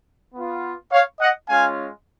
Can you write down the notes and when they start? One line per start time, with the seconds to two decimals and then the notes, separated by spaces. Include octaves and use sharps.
0.34 B3 F4
0.92 C#5 F5
1.20 D#5 F#5
1.48 G#3 C#4 F4 F5 G#5